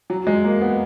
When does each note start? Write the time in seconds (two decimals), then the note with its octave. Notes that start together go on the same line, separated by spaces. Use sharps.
0.10 F#3
0.27 G#3
0.44 A#3
0.61 B3